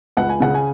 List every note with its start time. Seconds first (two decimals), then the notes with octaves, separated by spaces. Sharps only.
0.17 C#2 F#5
0.29 G#5
0.40 C#3 F#5
0.54 G#5